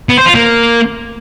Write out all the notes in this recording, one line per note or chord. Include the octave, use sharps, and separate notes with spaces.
B3
C5
F4
A#3